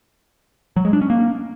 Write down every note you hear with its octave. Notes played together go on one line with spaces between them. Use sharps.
F#3
G#3
D4
C#4
A#3